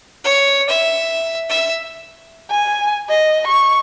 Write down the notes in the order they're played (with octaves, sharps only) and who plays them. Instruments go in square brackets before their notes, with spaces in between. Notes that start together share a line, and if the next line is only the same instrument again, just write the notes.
[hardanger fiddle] C#5
E5
E5
[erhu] G#5
D#5
C#6